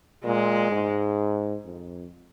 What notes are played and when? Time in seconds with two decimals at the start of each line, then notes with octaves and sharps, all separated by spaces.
0.25 A#2 G#3
0.71 G#2
1.64 F2